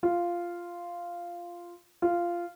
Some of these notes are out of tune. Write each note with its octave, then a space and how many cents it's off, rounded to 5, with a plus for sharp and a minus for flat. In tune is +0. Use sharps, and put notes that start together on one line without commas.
F4 -5
F4 -10